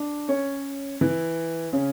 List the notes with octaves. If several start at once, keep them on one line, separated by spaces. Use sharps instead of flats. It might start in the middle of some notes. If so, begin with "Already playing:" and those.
Already playing: D4
C#4 C#5
E3 E4
C#3 C#4